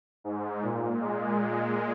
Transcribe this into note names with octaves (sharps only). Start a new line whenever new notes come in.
G#2
A#2
G#3